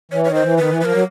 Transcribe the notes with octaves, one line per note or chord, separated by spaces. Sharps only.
E3 C#5
D#3 C#5
C5
E3
D#3 B4
E3
F3 A#4 B4
F#3